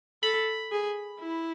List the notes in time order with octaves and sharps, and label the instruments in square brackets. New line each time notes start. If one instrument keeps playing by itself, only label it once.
[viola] A4 [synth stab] B5
[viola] G#4
E4